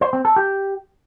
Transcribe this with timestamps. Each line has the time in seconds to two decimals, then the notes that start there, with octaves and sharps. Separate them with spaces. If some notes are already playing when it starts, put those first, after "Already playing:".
0.01 C5
0.13 C4
0.25 A4
0.36 G4